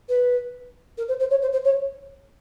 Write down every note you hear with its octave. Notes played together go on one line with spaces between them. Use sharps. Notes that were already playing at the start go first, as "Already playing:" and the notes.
B4
A#4
C5
C5
C#5
C5
C5
C#5